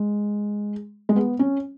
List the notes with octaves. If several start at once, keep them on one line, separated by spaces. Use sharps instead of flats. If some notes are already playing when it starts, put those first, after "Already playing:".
Already playing: G#3
G#3
B3
C#4